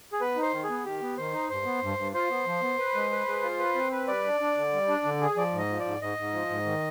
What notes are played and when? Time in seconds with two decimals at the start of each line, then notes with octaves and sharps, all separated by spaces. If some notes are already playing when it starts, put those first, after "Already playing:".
0.12 G#4
0.21 B3 B4
0.36 D#4
0.42 C5
0.52 D#3
0.64 G#4
0.69 B3
0.84 D#3 G4
1.02 B3
1.17 D#3 C5
1.33 D#4
1.50 G2 C5
1.65 B3
1.82 G2
1.98 G2
2.14 F4 C5
2.30 B3
2.46 F3
2.62 B3
2.78 B4
2.95 G#3
3.11 B4
3.27 G#3
3.43 F4
3.59 B4
3.75 C4
3.92 B4
4.08 G3 D5
4.24 D4
4.41 D4
4.57 D3
4.73 G3
4.88 D4
5.05 D3
5.21 G#4
5.36 F3 D5
5.53 G#2
5.58 D#5
5.69 F3
5.80 D5
5.85 G#2
6.01 G#2 D#5
6.18 G#2
6.33 F3
6.49 G#2
6.65 D#3